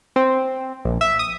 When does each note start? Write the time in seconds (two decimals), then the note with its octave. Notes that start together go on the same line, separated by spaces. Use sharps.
0.16 C4
0.85 A#1
1.01 E5
1.19 D#6